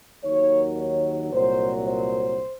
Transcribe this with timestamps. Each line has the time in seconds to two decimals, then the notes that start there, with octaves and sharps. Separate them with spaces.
0.24 D#2 D#3 F#3 C#5
0.78 C#5
1.33 C2 A#2 F#3 C5
1.87 C5